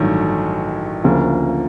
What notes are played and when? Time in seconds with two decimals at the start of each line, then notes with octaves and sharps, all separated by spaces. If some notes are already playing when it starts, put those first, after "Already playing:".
Already playing: A1 G2 D#3 F#3 A3
1.04 D2 C#3 F3 A#3